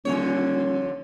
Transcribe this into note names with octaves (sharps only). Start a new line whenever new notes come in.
D#1 F2 D3 C#5